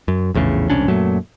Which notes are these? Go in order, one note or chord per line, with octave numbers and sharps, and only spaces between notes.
F#2
A#1 E2 A2 C#3
E1 C2 C#4 D4
F#2 A#2 F#3 A3